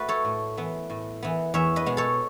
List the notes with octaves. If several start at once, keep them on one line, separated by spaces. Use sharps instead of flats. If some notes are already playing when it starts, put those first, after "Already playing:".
Already playing: A3 F#4 B4
A4 C#5
A2
E3 B3
A2
E3 B3
E2 C#5 E5
B4 D#5
B2 G#3 B3
A4 C#5